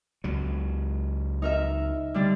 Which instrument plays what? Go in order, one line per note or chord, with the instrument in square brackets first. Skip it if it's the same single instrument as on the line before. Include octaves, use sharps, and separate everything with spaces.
[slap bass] C#2 F#3
[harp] D#4 A#4 E5
D3 G3 D4